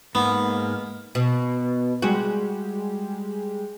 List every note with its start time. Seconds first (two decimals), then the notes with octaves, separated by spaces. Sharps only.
0.15 G#2 A#3 B3
1.15 B2
2.02 G3 G#3 F#4 G4